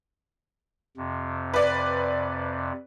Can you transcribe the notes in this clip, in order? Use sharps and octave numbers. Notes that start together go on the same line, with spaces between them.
F2 C3
B4 D5